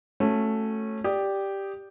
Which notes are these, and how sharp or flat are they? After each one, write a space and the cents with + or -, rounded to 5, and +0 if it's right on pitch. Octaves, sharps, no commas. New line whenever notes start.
A3 +0 C#4 -15 F#4 +0
G4 +0 D5 +0 D#6 +0